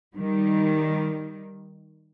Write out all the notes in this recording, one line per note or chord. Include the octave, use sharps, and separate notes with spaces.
D#3 G3